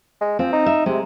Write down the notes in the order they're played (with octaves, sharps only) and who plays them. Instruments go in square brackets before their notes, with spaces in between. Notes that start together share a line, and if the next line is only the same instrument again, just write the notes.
[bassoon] G#3
[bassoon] F3 [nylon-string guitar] C4
[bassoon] D#4
[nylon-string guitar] E5
[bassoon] C3 [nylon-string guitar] G#3